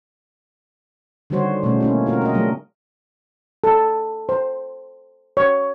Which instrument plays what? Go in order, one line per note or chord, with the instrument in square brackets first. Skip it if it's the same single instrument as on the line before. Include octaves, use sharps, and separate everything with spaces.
[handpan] D3 D#3 G3 F#4 C5 C#5
B2 G#3 A3 C#4
A#3 C#4 E4
C4 F4 F#4 A#4
A#4 D#5
C#3 F#3 G#3 A3 D4
[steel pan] A4
C5
C#5